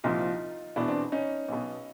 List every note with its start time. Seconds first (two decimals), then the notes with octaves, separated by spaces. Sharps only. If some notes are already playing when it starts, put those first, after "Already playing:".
0.04 C2 A#2 F3 D#4 F4
0.76 E2 B2 D4 E4
0.88 C4 D4
1.12 C#4 D#4
1.48 B1 B2